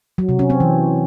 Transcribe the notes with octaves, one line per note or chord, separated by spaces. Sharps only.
F#3
C3
C#4
C4
E3